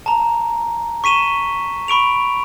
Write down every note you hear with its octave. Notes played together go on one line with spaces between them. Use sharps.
A5 A#5
C#6 B6 D#7 E7 G7
B5 C#6 D7 F7